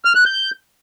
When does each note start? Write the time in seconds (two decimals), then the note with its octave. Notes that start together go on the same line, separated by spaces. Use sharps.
0.05 F6
0.15 F#6
0.25 G6